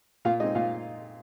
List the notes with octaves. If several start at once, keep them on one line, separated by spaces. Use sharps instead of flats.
A#2 F4 F5
G#3 C4 D#4 D#5
A#2 F4 F5